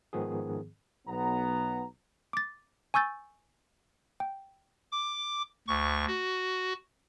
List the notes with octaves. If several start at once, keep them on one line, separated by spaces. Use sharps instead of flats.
G#2 D#3 F3 B3 G#4
B1 B3 A#5
D6 A6
G#5 C#6 E6 G6 A6
G5
D6
D2 C#6
F#4